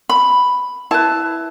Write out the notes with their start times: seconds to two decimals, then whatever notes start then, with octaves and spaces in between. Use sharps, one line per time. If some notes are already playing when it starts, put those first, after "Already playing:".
0.09 B5
0.91 E4 B4 A5